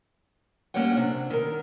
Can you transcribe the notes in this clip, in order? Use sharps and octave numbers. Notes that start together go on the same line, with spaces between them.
G3 A#3 C#4 D5 F#5 G5
C3 D4
D#3 A#4